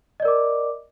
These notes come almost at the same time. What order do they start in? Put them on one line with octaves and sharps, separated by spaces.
D#5 D5 A#4 D6